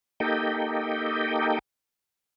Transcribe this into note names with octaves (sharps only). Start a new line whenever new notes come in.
A#3 D#4 G4 A4 D#5 G5